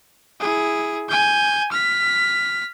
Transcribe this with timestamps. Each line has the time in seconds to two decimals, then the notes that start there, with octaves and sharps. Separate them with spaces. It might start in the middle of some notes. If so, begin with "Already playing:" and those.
0.40 E4 G#4
1.09 G#5 G6
1.72 F6 B6